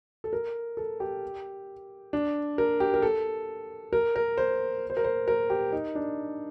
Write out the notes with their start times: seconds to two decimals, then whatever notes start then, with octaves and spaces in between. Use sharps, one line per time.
0.24 A4
0.33 A#4
0.77 A4
1.00 G4
2.13 D4
2.58 A#4
2.80 G4
2.94 A#4
3.02 A4
3.93 A#4
4.16 A#4
4.38 C5
4.90 C5
4.97 A#4
5.04 C5
5.28 A#4
5.50 G4
5.73 D#4
5.95 D4